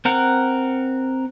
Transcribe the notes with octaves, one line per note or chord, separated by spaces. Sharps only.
C4 A#4 F#5